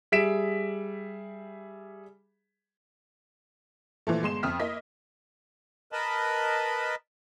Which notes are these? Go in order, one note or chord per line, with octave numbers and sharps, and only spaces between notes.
G3 G#4 E5 B6 D7 E7
A#2 E3 F3 A3
G1 G#3 C6 E7
F2 D#6 F6 B6
A#3 E4 D#5 B6
A#4 B4 D#5 A5 B5